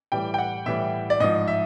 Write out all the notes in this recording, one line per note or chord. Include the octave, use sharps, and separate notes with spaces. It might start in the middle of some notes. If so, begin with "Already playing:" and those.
A2 E3 G3 G5
G5
F#5
A2 E3 G3 E5
D5
G#2 F3 D#5
E5